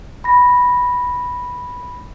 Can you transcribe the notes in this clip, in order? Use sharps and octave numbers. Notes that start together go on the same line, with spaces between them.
B5 A#6